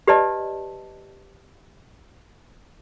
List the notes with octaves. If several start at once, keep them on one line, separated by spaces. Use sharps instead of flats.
G4 B4 D5 D#5 A5